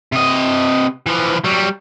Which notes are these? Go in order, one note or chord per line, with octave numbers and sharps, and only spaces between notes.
C3 D#5
E3 F3
F#3 G3